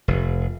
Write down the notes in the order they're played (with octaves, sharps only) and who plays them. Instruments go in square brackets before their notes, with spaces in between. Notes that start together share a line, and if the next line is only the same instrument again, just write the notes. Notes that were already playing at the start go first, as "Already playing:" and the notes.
[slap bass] F1